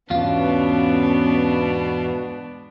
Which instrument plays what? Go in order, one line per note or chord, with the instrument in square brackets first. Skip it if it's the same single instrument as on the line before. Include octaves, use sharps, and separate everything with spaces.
[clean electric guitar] E2 G#2 F4 [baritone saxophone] B2 [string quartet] G#3 B3 D4 [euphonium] C#4